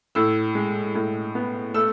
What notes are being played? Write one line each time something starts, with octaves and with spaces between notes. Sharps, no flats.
A2 E6
G#3
A2
B3
A3 E6